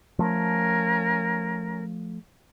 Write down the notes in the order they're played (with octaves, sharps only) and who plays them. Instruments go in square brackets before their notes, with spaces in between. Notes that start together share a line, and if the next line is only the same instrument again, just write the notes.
[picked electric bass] F3 A3 [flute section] C#4 A#4